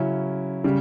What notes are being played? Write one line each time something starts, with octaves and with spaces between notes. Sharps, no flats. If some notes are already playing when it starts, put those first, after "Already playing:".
Already playing: C#3 F#3 C#4 E4
C#3 G3